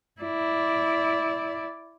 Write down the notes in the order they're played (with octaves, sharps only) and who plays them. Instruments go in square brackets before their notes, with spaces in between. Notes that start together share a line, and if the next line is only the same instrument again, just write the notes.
[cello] E4 D5